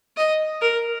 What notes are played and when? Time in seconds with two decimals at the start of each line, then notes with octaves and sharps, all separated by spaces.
0.17 D#5
0.61 A#4